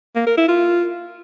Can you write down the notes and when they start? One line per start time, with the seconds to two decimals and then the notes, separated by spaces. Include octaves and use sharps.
0.16 A#3
0.27 A#4
0.38 E4
0.48 F4